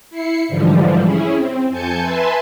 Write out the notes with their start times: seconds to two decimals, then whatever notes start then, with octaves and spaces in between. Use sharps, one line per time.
0.10 E4 C7 C#7
0.48 G#2 D3 E3 F3 G3
1.01 C#4 E4 G#4
1.34 C4
1.69 F2 G#5 A5 G6 C#7
2.00 B4 E5 G#5 A5 C6